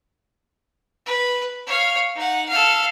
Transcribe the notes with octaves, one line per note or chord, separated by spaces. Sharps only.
B4
C#5 F5
D#4 F#5
A4 F5